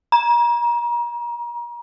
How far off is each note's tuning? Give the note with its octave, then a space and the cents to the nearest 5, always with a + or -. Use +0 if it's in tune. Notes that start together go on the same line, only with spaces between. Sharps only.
A#5 +35